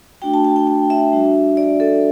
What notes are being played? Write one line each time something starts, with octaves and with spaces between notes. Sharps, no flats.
A3 D4 F#4 G5
A5
G5
G5
G5
E5
G3 D4 F#4
D5
A4